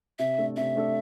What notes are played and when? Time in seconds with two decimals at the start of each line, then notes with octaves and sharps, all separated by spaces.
0.19 C3 E5
0.38 A3 D4 A4
0.56 C3 E5
0.76 A3 D4 A4